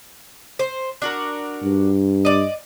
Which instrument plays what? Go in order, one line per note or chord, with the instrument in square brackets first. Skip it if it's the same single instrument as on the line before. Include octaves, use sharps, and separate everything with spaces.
[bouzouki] C5
D4 F#4 A#4
[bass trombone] G2
[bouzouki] D5 D#5